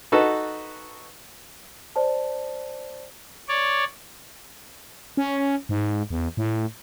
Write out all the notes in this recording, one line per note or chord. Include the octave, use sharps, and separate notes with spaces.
D#4 F#4 A4 B4 D#5
C5 D5 A5
C#5 D5
C#4
G#2
E2
A2